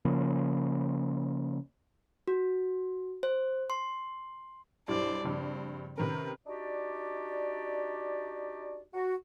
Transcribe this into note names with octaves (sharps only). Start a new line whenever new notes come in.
C#3 F3 A#3
F#4
C5
C6
B1 G2 E4 G4 C5 D5
A#1 G2 C#3 C4
C3 D#3 C#4 A#4 B4
D4 D#4 F#4 G4 D5
F#4